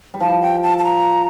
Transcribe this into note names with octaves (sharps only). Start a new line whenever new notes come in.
G3
F3 A5
G5
A5
A5
A#5